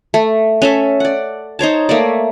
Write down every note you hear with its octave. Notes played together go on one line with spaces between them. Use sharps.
A3
C#4 A4 E5
D5 F#5
D#4 C5 C#5 A5
A3 A#3 C#5 D5